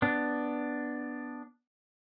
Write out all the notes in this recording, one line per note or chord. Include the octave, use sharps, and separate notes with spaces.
B3 D4